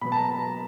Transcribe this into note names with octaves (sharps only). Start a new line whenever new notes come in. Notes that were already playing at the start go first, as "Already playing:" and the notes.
B2 F#3 B3 B5
A5
A#5